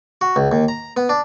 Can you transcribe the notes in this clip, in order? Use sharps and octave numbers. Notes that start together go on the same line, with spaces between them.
F#4
C#2
D#2
A#5
B3
D4